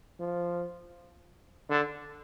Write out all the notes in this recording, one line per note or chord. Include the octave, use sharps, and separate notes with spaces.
F3
D3